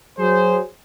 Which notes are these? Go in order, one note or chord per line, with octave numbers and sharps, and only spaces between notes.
F#3 G#4 C5